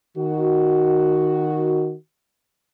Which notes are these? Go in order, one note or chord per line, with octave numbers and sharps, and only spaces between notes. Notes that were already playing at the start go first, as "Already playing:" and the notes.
D#3 F#4